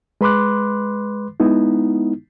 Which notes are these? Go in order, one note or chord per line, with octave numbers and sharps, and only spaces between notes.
G#3 B4 B5 C6 D6 F#6
G#3 B3 D#4 E4